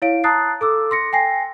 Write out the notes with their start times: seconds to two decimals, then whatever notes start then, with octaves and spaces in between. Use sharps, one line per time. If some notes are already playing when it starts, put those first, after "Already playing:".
0.02 E4 C#5 F5 D7
0.24 A5 A#5 D#6 F#6 A6 C7
0.61 A4 D6 E6
0.91 C6 A#6 C#7
1.13 G5 G#5 A#6 C7